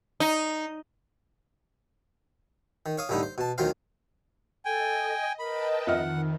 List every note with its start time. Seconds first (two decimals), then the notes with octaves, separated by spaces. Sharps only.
0.20 D#4
2.86 D#3
2.98 C#5 F5 D#6
3.09 C2 A2 D3 D#4 E4
3.23 C5
3.38 B2 A5
3.58 D2 D#3 F#3 F4 C5 F5
4.65 A4 D#5 G5 G#5
5.39 A#4 B4 D#5 G5 A5 B5
5.87 F2 D#3 E5 F#5 F6